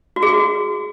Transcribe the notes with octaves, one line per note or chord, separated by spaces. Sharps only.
F#4
G#4
F#4